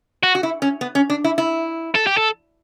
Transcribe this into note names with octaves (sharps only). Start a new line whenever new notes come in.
F#4
F#4
E4
C#4
B3
C#4
D4
E4
E4
A4
G4
A4